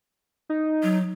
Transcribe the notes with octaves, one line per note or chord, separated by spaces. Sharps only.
D#4
F#3